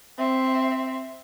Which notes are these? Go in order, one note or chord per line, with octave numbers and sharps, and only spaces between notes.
C4 E5